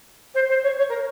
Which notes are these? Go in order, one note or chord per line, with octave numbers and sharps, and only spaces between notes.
C5
C5
C#5
C#5
A#4